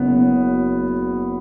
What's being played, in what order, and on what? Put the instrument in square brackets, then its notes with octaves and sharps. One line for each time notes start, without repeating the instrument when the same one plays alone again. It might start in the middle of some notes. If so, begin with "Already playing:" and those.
Already playing: [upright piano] F#1 F#2 C#3 B3